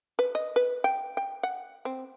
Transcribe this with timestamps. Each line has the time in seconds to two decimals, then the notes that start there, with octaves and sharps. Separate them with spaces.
0.19 B4
0.35 D#5
0.56 B4
0.84 G5
1.17 G5
1.43 F#5
1.85 C4